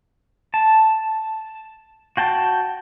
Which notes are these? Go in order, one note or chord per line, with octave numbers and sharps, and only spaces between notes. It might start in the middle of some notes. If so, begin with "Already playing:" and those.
A5
F#4 G5 A5